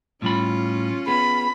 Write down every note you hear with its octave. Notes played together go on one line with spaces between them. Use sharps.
A2 G3 C#4 F4 B5
B3 G#4 B5